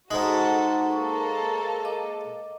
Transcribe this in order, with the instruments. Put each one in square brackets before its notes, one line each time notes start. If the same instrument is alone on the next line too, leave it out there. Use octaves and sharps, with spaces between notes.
[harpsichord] G#2 G#3 [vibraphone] D#4 F#5 A#5 [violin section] F#4 A4
[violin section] A#3 A4 [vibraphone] C#6
[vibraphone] D#5 D6